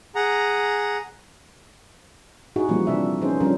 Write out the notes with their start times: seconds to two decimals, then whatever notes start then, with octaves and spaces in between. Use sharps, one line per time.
0.15 G#4 F#5 A#5
2.56 D#4 E4 F#4 G#4
2.68 A#2 E3 F3 G3 A#3 C4
2.87 C3 D4 F4 E5
3.21 F3 B3 C#4 D#4 G#4 C5
3.40 F3 G3 C#4 D4 F4 A#4